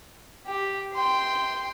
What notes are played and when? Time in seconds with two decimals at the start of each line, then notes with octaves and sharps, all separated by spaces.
0.47 G4
0.94 G5 C6